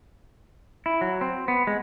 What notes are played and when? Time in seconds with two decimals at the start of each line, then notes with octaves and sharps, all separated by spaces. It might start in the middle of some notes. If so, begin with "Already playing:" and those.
0.86 E4
1.01 F#3
1.21 C4
1.48 B3
1.67 G#3